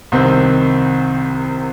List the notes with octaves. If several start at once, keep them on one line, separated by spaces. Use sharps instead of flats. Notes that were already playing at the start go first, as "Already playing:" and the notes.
C2 C3 D#3 C4